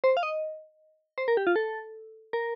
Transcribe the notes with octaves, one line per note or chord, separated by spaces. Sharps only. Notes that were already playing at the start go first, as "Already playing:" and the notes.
C5
F5
D#5
C5
A#4
G4
F4
A4
A#4